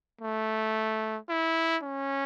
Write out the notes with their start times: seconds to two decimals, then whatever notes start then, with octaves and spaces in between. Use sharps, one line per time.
0.21 A3
1.29 E4
1.83 C#4